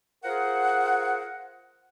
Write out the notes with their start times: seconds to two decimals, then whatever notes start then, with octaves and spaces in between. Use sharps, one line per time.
0.24 F4 G#4 A#4 C5 F#5